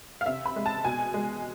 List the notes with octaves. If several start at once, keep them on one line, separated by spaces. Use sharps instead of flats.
F5
C3 E5
B5
G#3
A5
B2 G#5
G#3